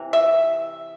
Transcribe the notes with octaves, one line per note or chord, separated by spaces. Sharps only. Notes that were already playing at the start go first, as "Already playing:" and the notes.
Already playing: C3 E3
E5